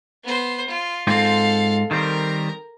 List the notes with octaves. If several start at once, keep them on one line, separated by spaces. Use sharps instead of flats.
B3 C5
F4
G#2 C4 F4 A4 F5
D#3 G3 C4 A#4 A#5